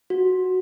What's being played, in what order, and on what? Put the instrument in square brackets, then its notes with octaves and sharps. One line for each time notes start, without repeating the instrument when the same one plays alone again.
[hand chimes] F#4